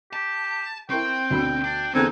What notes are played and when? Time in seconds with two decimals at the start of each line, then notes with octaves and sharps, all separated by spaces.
0.13 G4 A5
0.90 C4 E4 A#4 G5 C#6
1.30 D2 B2 B5
1.64 D4
1.95 E2 D3 C4 D#4 G#5